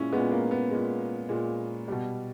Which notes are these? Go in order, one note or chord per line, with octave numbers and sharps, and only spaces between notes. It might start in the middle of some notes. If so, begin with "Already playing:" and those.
Already playing: A#2 G#3 C#4 E4
A#2 G#3 B3
A#3
B3
A#2 G#3
A#2 G#3
B2 G3